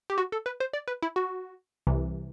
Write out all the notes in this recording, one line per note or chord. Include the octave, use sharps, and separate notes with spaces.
G4
F#4
A4
B4
C5
D5
B4
E4
F#4
C2 C3 E3